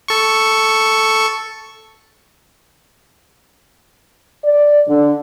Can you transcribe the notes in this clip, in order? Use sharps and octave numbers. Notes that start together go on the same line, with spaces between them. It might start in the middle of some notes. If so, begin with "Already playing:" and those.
A4 C#6
D5
D3